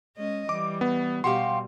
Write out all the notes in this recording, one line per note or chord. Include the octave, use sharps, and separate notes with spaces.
G#3 C#4 D#5
E3 G3 D6
B3
B2 G3 F#4 G4 F5 C6